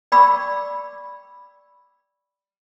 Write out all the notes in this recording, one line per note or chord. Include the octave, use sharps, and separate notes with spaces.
D5 G5 B5 C#6 D6 E6